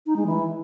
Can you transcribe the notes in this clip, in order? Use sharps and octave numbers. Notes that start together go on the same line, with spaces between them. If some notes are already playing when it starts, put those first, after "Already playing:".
D#4
G#3
E3